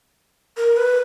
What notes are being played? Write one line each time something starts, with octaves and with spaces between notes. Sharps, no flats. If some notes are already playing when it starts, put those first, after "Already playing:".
A#4
B4